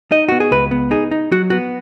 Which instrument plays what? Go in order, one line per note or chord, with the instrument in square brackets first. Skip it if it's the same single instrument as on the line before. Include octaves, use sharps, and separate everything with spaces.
[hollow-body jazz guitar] D#4 D#5
B3 F#4
G#4
C#2 B4
B3
D#4 G#4
D#4
F#3 F#4
B3 F#4